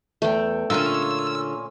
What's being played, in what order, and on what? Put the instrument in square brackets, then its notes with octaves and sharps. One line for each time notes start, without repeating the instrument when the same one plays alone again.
[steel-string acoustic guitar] E2 [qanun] A3 G5
[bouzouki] A#2 C#4 [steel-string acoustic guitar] D3 F4 A#4 [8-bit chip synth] E6